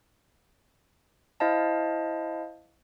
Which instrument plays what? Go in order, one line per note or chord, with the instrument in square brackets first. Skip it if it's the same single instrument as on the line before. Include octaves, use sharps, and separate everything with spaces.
[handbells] E4 C5 D#5 F5 A5